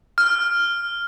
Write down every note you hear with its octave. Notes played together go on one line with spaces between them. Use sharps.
F6